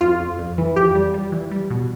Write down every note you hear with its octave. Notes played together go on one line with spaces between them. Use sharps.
F2 F4
F2
F2
E3
F2 G4
G3
G3
E3
G3
B2